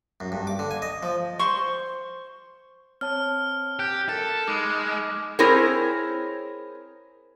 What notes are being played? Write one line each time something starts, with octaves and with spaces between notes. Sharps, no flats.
F#2
G2
D6
D3
G#5
D#5
F3
C5 C6 C#6
C4 C#5 A5 F6
G4 F#6 G6
A4 A#4 A6
G#3 D#4 B5 D6 D#6
C4 E4 G#4 A#4 C5 C#5